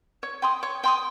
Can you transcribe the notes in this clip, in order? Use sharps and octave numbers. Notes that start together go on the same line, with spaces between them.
C#5
G5 C6 D#6
C#5
G5 C6 D#6